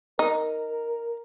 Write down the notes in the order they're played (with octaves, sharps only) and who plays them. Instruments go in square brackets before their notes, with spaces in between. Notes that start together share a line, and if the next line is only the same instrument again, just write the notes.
[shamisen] D#4 [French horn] A#4